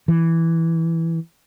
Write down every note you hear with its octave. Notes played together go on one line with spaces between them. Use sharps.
E3